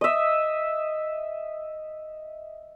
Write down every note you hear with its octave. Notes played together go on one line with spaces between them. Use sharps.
D#5 E5